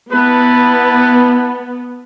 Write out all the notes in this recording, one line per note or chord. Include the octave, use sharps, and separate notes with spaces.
B3 E4 B4 A5